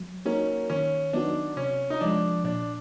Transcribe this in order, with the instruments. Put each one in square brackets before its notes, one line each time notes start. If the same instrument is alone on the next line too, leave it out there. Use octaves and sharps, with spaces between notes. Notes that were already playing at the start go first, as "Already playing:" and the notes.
Already playing: [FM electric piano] F#3
[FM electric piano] A#3 D#4 F#4 A#4 [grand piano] C#4
[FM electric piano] D#3 [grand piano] C#4
[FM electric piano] F#3 B3 D#4 F#4 [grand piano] D4
[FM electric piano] C3 [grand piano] C#4
[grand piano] D#4
[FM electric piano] F3 G#3 [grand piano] D4
[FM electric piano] A#2 [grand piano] D4